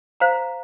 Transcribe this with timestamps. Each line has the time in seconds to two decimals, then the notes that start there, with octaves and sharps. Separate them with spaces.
0.20 C5 F5 A#5